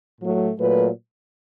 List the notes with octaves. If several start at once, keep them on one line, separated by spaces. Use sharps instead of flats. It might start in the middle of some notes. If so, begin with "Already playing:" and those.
A2 F#3 A3
A#2 F#3 A3 B4